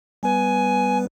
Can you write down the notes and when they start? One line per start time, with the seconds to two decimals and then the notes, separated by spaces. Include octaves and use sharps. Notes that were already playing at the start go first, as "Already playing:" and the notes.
0.23 G3 B3 B4 G#5